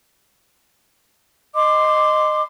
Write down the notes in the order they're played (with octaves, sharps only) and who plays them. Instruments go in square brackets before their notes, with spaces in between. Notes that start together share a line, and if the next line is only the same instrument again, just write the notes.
[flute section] D#5 C6 D6